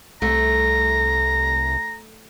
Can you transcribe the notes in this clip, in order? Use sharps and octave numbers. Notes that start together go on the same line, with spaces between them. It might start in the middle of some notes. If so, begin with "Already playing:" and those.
C2 A3 A#5